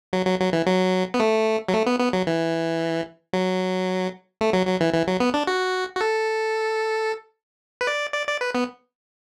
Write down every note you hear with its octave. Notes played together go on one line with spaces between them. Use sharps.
F#3
F#3
F#3
E3
F#3
B3
A3
F#3
A3
B3
B3
F#3
E3
F#3
A3
F#3
F#3
E3
E3
F#3
B3
D4
F#4
F#4
A4
B4
D5
D5
D5
B4
B3